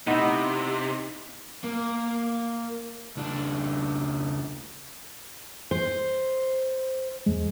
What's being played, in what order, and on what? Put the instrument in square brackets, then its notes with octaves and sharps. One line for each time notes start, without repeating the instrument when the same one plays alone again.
[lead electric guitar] C3 [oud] B3 E4 [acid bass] D#4 [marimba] D#5 F#5
[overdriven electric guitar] A#3
C#2 D4
[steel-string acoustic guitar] C5
[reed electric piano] E2 G#3